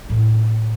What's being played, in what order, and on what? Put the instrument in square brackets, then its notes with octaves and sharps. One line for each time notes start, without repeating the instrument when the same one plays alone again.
[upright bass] A2